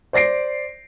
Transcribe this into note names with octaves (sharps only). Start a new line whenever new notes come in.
C5 D5 A#6 C7 D7